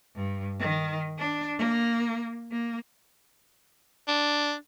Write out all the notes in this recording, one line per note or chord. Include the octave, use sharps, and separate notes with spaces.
G2
D#3
D4
A#3
A#3
D4